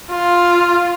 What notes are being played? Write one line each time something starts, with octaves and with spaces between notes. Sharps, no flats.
F4